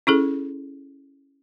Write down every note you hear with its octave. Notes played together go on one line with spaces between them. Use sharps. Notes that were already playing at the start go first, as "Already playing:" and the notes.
C#4 E4 G#4 A4